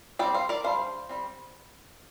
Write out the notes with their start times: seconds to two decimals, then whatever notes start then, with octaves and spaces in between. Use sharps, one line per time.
0.19 G3 C4 D5 G5
0.34 C5 F5
0.49 A#4 D5
0.64 G3 D4 C5 F5
1.09 G3 C4